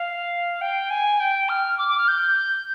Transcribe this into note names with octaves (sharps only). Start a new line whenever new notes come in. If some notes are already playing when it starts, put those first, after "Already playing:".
Already playing: F5
G5
G#5
G5
F6
D6
D6
F6
G6